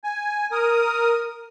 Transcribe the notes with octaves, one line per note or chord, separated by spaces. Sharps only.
G#5
A#4 D#6